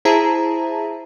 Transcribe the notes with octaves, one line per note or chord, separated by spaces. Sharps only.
E4 G#4 C5 E5 A5 A#5